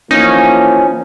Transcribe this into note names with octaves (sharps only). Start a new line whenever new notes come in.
E3 F3 A#3 C#4 D#4